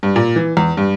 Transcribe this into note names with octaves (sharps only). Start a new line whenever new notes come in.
G2
A#2
E3
E2
G2